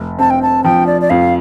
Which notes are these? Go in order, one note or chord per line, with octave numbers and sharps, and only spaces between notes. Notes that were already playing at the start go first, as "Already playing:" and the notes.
Already playing: F1
C4 A5
G5
A5
F3 G5
D5
D5
F2 F5